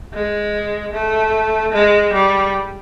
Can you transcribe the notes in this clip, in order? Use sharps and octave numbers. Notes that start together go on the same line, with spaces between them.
G#3
A3
G#3
G3